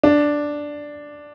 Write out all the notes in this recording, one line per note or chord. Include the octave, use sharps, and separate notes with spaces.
D4